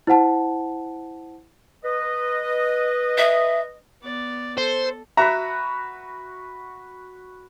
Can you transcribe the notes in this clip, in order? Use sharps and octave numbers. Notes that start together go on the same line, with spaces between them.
E4 C5 F#5 A5
B4 D#5
E5
B3 D5
A4 C5
F#4 B4 E5 A#5 B5